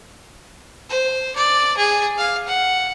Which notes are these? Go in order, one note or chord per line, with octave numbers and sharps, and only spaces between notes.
C5
D5
G#4
F5
F#5